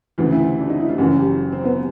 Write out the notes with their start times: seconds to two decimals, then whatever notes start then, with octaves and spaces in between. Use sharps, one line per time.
0.18 D2 C#3 E3 F4
0.32 E4
0.45 F4
0.60 D4
0.70 D#4
0.80 E4
0.89 F4
0.98 F#1 F#2 C#3 E3 F#4
1.19 G4
1.52 C4
1.65 B3